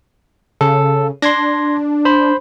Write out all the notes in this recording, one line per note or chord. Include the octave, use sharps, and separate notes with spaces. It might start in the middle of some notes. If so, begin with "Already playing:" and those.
C#3 A4
D4 C6 G#6 A#6
C5 B5